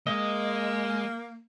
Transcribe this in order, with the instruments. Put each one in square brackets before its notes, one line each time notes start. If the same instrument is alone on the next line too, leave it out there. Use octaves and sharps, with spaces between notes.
[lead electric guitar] G#3 [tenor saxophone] A#3 [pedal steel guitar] D#5